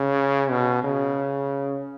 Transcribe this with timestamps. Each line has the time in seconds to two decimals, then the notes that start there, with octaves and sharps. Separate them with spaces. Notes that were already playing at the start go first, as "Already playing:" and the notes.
Already playing: C#3
0.51 B2
0.84 C#3